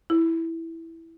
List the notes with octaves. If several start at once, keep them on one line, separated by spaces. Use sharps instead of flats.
E4